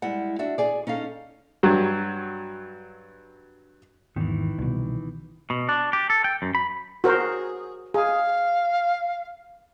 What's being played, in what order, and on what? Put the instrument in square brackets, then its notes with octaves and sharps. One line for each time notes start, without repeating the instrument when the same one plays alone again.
[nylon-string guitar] G3 G#3 E4 F#5
D4 F#4 E5
G#4 D5
C#4 D#4 A4 F5
[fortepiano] G2 F#3
[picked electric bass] G#1 E2 [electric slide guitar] D#3 E3
[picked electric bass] C2 B2
[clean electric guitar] B2
D4
G4
A4
G5
F#2
B5
[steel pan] F#4 A#4 C5 [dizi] G#4
[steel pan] G#4 [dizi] F5